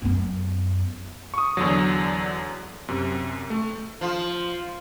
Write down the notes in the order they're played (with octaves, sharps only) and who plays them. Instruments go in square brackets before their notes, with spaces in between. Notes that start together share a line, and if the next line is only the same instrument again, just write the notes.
[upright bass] F#2 B3
[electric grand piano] C#6 D#6
E2 D3 F#3
F#2 C3
A3
[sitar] F3 [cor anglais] F4